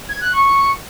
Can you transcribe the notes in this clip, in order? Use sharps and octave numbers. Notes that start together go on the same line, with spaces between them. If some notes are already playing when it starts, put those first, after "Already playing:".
G#6
F#6
C#6